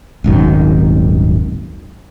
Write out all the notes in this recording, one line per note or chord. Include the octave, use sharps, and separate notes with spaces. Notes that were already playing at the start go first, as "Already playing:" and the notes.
D#1 G#1 F#2 D#3